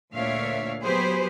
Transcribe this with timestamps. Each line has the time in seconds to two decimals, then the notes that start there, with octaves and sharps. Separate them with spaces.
0.14 D2 A#2 D4 C#5 E5 F5
0.83 F#3 B3 G4 G#4 B4 C5